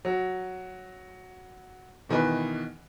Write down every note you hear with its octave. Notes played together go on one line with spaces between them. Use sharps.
F#3
B2 D#3 E3 B4